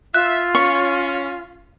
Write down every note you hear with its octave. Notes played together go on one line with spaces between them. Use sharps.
F4 E5 F#6
C#4 C#6